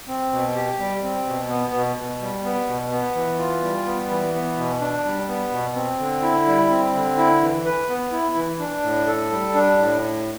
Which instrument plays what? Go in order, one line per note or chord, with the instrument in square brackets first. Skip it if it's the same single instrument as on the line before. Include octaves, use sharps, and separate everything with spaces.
[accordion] C4
B2
G4
G3
C4
B2
B3
B2
B2
G3
B3
B2
B3
E3
F4
G3
B3
E3
B3
B2
D4
G3
B3
B2
C4
D3
E4
G3
C4
D3
E4
E3
B4
B3
E4
E3
D4
A2
A4
G3
D4
A2